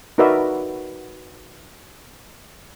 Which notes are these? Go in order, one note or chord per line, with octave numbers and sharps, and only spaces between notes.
D#4 F#4 A#4 B4 D5 E5